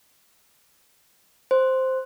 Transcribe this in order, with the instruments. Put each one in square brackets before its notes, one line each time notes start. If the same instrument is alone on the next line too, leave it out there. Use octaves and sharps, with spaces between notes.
[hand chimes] C5